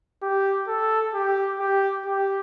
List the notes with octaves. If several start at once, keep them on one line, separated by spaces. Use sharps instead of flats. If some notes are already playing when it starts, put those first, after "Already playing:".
G4
A4
G4
G4
G4